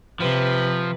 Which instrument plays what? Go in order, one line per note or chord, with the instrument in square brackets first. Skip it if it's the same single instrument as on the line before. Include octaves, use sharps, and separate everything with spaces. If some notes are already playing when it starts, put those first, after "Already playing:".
[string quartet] C3 B4 [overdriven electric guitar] F3